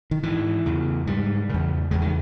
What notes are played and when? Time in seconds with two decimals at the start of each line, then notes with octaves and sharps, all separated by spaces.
0.11 D#3
0.23 G#2 E3
0.66 E2 C#3
1.07 G#2 G3
1.49 E2 C#3
1.91 E2 C#3 G#3
2.02 D#3